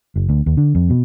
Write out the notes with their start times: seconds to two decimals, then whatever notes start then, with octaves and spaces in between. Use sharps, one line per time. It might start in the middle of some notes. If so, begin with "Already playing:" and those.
0.16 F#1
0.29 D2
0.46 D#2
0.57 D3
0.75 F2
0.90 B2